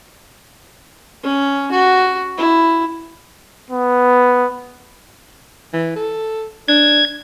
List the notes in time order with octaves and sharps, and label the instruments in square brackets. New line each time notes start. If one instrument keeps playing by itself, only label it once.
[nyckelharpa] C#4
F#4
E4
[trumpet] B3
[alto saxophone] E3
A4
[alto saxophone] D4 [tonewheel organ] G#6